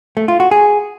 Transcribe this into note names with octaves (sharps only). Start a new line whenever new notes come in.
A3
F4
F#4
G#4